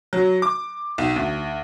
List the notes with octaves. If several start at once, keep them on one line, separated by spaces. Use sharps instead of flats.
F#3
D6
B1
D2